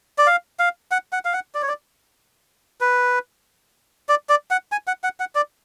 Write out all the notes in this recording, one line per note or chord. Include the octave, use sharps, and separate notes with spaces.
D5
F5
F5
F#5
F#5
F5
F#5
D5
C#5
D5
B4
D5
D5
F#5
G#5
F#5
F#5
F#5
D5